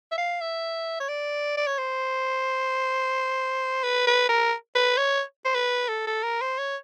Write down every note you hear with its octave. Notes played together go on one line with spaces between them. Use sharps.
E5
F5
E5
C#5
D5
D5
C#5
C5
B4
B4
A#4
B4
C#5
C5
B4
A4
A4
A#4
C5
C#5